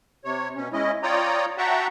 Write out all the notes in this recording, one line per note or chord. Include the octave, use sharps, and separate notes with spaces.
C3 C#5
B2 C#4
G#3 C#4 E4 D#5
F4 C#5 D5 G5 A#5 D#6
F#4 E5 F#5 G5 A5 A#5